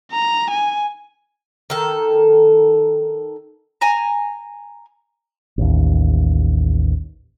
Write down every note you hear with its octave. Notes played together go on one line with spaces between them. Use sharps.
A#5
G#5
D#3 A4
G#5 A#5
A1 D#2